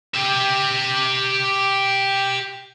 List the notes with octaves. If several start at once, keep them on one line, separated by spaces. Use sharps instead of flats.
G4 E5